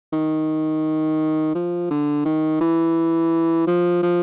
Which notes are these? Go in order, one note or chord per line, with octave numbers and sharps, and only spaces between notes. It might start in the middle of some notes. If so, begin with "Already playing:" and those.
D#3
F3
D3
D#3
E3
F3
F3